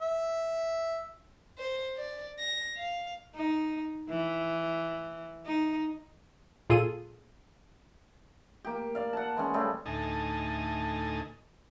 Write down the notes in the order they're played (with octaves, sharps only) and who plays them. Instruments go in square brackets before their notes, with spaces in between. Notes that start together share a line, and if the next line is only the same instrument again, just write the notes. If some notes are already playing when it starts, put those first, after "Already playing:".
[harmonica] E5
[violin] C5
D5
A#6
F5
[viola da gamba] D#4
E3
D#4
[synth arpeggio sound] A#2 F4 G#4 A4 D#7
[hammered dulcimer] A#3 G4
D5 F5
F#5 A5
E3 G#3 C#4
C#3 G3 A3 G#4
[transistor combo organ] D2 A2 D#4 D#5 G#5 A5